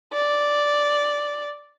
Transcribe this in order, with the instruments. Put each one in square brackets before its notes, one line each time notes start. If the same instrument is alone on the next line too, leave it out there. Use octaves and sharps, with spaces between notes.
[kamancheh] D5